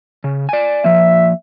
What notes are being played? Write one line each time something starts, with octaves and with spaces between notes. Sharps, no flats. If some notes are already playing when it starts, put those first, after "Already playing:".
C#3
D5 G#5
F3 A#3 E5